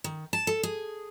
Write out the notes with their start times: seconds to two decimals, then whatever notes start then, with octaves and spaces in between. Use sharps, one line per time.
0.04 D#3
0.33 A5
0.47 A4
0.63 G#4